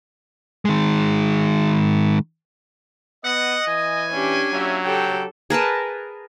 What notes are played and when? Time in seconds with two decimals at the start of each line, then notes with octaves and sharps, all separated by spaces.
0.65 D#3 G#3
3.24 B3 D#5 F#5
3.68 E3 G#5
4.11 C#4 D4 G4
4.53 F#3 A#3 F4 E5
4.84 C#3 C4 G4 A4 G5
5.50 G#4 A#4 B4 A5